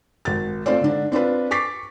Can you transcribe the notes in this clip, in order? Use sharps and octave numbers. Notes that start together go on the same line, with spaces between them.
G#1 A6
A3 C4 F4 C5 D5
G#2 D3 D4
C4 D4 F4 B4
C#6 D6 A6 B6 C7